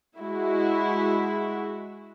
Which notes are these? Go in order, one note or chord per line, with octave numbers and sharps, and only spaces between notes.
G#3 E4 F#4